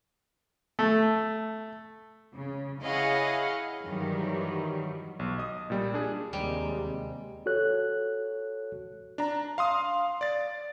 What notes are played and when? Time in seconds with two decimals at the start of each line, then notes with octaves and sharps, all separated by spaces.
0.79 A3
2.34 C#3
2.82 E4 G#4 C#5 D#5 F5 F#5
3.84 G2 D#3 E3 F#3 G3
5.19 B1
5.38 D#5 D#6
5.70 A#2 G3
5.94 D4 G#4
6.33 D#2 C3 G3 G#3
7.46 F#4 A4 C#5 F#6
9.18 D4 A#5
9.58 F5 C6 D#6
10.21 D5 A6